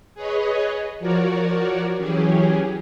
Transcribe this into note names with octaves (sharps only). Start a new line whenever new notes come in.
G#4 B4 C#5 D#5
F3 F#4 A#4 C#5 D5
E3 F#3 C#4 G4 G#4